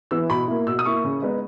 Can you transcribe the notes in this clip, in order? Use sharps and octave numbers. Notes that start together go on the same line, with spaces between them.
E3 B3 E4 E6
B2 B5
A#3 E4
B2 E6
D#6
A#3 E4 C#6
C#3
G#3 B3 D#4